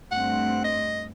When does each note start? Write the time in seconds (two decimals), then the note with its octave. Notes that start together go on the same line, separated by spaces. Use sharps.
0.12 G2 A3 C4 F#5
0.64 D#5